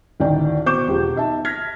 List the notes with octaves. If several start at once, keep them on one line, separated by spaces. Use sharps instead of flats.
A1 D2 D#3 E4 D5 G5
B2 C5 C#6 D6 G6 E7
E1 F3 G4
D#4 E5 A5
F6 G#6 A#6 B6